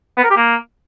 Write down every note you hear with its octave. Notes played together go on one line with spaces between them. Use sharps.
B3
A#4
G4
A#3